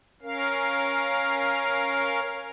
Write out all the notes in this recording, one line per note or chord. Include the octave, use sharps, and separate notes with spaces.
C#4 A#4 F5